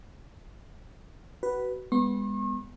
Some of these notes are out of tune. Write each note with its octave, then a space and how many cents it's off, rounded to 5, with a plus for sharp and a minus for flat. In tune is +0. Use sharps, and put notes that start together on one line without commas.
F#4 +25 B4 +0
G#3 -35 B3 +0 C#6 -45